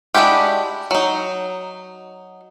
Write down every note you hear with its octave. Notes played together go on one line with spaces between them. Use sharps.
G#3 D4 E4 F#4 G4
F#3 D#4